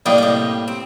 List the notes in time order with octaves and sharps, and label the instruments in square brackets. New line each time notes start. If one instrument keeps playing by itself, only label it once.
[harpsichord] A2 G3 A#3 [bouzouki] D4 D#5
[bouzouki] C3 D#5
C4